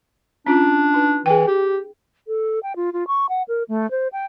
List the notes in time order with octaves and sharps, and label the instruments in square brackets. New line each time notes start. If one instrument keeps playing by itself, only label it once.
[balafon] C#4 F4 [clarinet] D4
[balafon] D#4 B4
[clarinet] E3 [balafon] G#4 G5
[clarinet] G4
[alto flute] A4
G5
F4
F4
C#6
F#5
A#4
A3
C5
G5